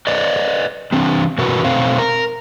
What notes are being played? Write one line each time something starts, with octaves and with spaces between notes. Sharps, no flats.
B4 D5 D#5
E3 C4 D4
B2 E3 F#4 A#4 B4
B2 A3 C4 C5 F5
A#4